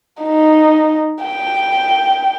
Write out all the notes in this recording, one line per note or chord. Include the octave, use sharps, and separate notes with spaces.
D#4
G5